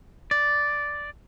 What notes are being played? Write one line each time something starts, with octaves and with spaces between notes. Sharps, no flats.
D5